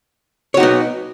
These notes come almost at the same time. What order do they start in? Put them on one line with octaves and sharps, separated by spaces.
C#5 F#4 D#4 B3